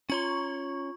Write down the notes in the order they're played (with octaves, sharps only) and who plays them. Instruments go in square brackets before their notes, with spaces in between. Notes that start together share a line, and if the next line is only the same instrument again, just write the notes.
[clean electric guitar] C#4 C#5 C6 [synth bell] F4 C#6